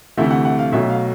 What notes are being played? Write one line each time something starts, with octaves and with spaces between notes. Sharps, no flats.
D2 C3 E3 A3 E5
F#5
F#5
F5
B1 B2 F#3 A3 E5
F5